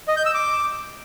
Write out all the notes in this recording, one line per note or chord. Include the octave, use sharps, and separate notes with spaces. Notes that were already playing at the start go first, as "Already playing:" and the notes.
D#5
G6
E6
D6